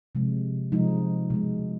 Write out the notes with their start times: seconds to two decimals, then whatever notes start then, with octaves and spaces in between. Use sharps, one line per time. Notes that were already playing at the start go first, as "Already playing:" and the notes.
0.15 C3 F3 G#3
0.72 C3 F3 G#3 D#4
1.30 B2 G#3